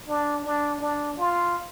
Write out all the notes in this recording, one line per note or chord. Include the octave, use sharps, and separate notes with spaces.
D4
D4
D4
F4